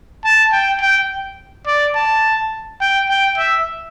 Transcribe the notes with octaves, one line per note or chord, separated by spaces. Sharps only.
A5
G5
G5
D5
A5
G5
G5
E5